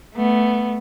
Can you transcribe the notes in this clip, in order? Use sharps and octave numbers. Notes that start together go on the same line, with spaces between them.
A3 B3